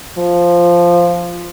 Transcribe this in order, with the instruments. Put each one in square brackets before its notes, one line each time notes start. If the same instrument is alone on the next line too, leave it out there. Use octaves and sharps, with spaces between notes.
[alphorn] F3